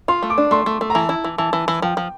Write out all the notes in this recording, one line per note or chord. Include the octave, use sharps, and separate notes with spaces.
F4 C6
A3
D6
D4
A3 C6
A3
A3
A#5
E3 A5
E4
E3
E3 A5
E3
E3
F3 G5
F3